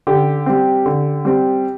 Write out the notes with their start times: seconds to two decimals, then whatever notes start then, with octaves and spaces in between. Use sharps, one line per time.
0.07 D3 G4
0.46 G3 C4
0.86 D3
1.25 G3 C4